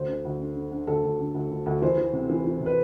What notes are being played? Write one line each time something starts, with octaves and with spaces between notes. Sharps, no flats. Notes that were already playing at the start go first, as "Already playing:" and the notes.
Already playing: D2 C5
D3
D2
D3
D3
D3
D2 A4
D2
D3
D2
D2
D2
E3 C5
E3
C3
E3
E3
C3
B4